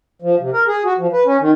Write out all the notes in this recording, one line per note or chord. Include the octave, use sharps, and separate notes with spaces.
F3
C3
A#4
G#4
F#4
F3
B4
C#4
D#3